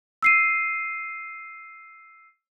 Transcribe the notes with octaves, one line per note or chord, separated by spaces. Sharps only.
E6 C7 D#7